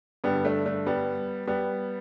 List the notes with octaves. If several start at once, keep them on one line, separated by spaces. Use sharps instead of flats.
G2 D3 G3 B3
A3 D4
A3 D4
G3 B3
G3 B3